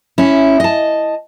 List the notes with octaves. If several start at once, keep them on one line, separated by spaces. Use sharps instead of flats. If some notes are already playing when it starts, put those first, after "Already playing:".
C#4 E4
D#5 A5